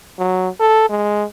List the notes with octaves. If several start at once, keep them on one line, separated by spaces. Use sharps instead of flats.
F#3
A4
G#3